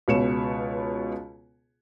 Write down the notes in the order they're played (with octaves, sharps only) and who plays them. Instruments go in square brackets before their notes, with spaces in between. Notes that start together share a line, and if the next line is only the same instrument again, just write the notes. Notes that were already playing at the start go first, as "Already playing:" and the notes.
[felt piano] C#2 B2 C#5 C#7 E7